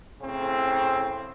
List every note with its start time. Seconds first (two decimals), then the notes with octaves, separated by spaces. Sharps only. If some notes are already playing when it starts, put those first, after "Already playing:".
0.22 A2 C#3 C4